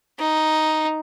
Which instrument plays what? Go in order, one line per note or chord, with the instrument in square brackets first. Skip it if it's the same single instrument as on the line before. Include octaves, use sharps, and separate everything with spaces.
[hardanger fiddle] D#4